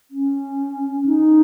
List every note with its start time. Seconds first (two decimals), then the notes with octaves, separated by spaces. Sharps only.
0.11 C#4
1.06 D#4